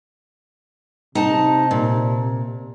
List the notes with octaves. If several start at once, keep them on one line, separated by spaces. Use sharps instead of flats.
C3 D#4 A5
A#2